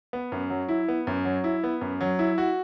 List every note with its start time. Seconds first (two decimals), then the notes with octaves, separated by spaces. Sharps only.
0.13 B3
0.32 F#2
0.50 F#3
0.68 E4
0.88 B3
1.07 F#2
1.25 F#3
1.44 E4
1.64 B3
1.81 F#2
2.01 F#3
2.19 E4
2.38 F#4